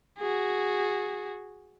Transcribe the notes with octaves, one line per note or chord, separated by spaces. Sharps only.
F#4 G#4